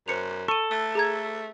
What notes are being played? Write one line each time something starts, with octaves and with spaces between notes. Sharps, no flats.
F#2 C5 C#7 F7
A4 C#6 D#7
A3 E6
G#4 A#5 G#6